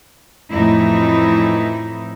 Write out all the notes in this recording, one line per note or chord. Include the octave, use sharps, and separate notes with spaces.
F2 A2 E3 D#4 E4